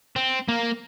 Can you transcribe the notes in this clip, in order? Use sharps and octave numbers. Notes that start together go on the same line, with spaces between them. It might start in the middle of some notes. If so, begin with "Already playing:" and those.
C4
A#3